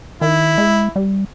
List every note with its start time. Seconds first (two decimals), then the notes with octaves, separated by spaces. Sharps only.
0.21 D#3 E4
0.58 G#3
0.96 G3